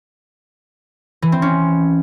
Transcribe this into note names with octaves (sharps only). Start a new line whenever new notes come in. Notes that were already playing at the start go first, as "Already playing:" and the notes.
E3
C4
C#4